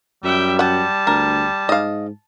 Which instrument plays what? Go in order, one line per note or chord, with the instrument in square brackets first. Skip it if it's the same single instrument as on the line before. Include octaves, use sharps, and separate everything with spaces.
[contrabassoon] F#2 [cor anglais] G3 [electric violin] E5 G5
[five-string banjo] F#5 G5 [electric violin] A5
[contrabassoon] D2 [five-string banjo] A#4
[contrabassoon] G#2 [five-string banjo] D#5 F5